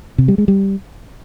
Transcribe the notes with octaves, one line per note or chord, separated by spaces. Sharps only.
C3
G3
G#3
G3